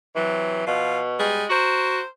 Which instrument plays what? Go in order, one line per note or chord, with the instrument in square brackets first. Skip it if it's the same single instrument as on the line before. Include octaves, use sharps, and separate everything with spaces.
[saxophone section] C3 F#3 [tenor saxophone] E3
[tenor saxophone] B2 [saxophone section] F3 F5
[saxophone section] G3 G#3 G#4
[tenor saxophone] F#4 [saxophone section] A#4 C5